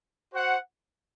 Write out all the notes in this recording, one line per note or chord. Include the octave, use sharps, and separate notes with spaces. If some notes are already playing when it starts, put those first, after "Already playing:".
F#4 C5 F#5